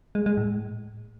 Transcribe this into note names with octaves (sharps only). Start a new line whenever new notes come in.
G#3
G#3
A2